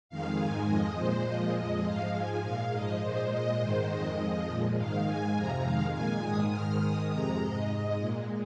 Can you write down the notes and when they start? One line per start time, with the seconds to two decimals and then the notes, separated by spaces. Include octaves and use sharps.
0.09 F2 D#3 G#3 F5
0.39 G#2 D#3 G#3 G#5
0.67 F2 F3 G#3 D#5
0.97 A#2 G#3 C5
1.26 A#2 F3 G#3 D#5
1.55 F2 F3 G#3
1.84 G#2 F3 G#3 F5
2.14 G#2 F3 G#3 G#5
2.43 A#2 G#3 F5
2.72 G#2 F3 G#3 D#5
3.02 A#2 G#3 C5
3.30 A#2 G#3 D#5
3.60 G#2 D#3 G#3 C5
3.90 F2 D#3 G#3 D#5
4.19 F2 F3 G#3
4.48 A#2 F3 G#3
4.77 G#2 D#3 G#3 F5
5.06 G#2 G#3 G#5
5.35 F2 C3 F3 A#5
5.64 F2 D#3 G#3 F5
5.94 A#2 G#3 G#5
6.23 G#2 D#3 G#3 D#6
6.52 G#2 D#3 G#3 F6
6.81 G#2 D#3 G#3 D#6
7.10 F2 C3 G#3 A#5
7.40 G#2 G#3 D#5
7.69 G#2 G#3
7.98 A#2 G#3